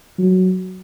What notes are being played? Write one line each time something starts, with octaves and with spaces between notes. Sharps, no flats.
F#3